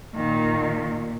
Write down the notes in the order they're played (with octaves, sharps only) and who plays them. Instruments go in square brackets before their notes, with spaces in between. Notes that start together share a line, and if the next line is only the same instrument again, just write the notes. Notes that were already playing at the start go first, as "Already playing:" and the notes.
[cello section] A#2 [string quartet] D#3